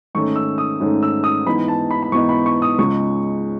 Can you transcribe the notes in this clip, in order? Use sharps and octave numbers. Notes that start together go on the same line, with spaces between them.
G#2 D#3 A3 C#4 C#6
E6
D#6
G#2 D#3 A3 C#4
E6
D#6
G#2 E3 B3 D#4 B5
A5
B5
B5
G#2 E3 B3 D#4 C#6
B5
C#6
D#6
C#2 C#3 G#3 C#6